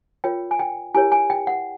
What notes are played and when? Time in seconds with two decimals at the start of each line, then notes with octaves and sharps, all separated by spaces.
0.24 F4 A#4 C#5 G5
0.51 G#5
0.59 G5
0.94 E4 G4 A#4 C#5 G#5
1.12 G#5
1.30 G5
1.47 F#5